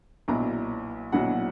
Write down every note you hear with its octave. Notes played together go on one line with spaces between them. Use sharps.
B1 A#2 F#3 B3 E4 A#5
B1 A#2 F#3 B3 E4 F#5